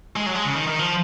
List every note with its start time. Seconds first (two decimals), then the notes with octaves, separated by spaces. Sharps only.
0.16 G#3
0.26 F#3
0.35 G#3
0.45 C#3
0.55 D#3
0.68 D#3
0.79 F3